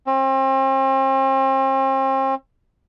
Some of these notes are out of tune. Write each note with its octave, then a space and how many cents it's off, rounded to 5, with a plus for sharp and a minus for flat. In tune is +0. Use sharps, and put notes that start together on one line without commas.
C4 +40